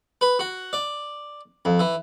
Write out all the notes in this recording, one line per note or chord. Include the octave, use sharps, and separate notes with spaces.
B4
F#4
D5
F2
E3